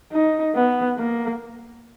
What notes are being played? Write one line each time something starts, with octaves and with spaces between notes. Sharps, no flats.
D#4
B3
A#3